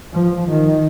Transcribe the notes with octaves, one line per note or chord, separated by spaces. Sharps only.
F3
D#3